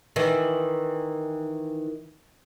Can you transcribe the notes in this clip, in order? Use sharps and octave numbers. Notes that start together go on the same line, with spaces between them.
D#3 E3